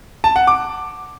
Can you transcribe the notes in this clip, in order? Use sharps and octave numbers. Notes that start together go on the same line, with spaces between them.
A5
F#5
D6